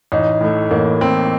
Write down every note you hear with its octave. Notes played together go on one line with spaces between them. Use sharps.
A1 D#4
A2 A3
A1 A#3
A2 A3 C4